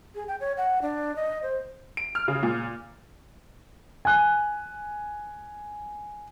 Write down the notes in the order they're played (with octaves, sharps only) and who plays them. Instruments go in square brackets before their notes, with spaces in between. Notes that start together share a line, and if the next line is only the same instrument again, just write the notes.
[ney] G#4
G5
C#5
F#5
D4
D#5
C5
[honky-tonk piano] D7
F6
C#3
A#2
[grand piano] G#5 F#6